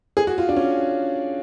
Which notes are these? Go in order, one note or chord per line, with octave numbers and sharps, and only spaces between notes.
G#4
F#4
F4
D4
C#4